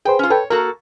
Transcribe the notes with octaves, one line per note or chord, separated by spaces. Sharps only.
G#4 B4 C5 G5
C#4 F4
A4 B4 C#5 G5
A#3 F#4 A4 A#4